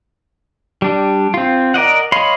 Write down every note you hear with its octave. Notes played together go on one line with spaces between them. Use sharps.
G3 D4
C4 F4
A#4 D5 D#5 F#5
C#5 D#5 F5 B5 C6